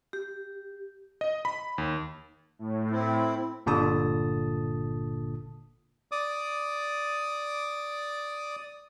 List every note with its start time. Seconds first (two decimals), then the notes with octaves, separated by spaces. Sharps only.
0.13 G4
1.21 D#5
1.45 B5
1.78 D#2
2.59 A2
2.91 C4 E4
3.66 G1 A#2 D3 A5 D#6
6.12 D5 D6 D#6